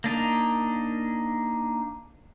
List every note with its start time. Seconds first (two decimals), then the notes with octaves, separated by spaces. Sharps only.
0.04 A#3 D4 D#4